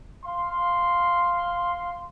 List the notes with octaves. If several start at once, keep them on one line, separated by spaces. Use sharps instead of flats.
F5 C6